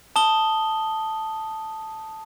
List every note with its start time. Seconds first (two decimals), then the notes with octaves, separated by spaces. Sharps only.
0.16 A5 D#6 G7